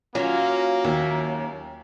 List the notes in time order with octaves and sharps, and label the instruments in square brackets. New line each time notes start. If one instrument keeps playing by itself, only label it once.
[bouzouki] F#3 [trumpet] A#3 [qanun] C#4 F4 E5
[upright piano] D#2 [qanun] E5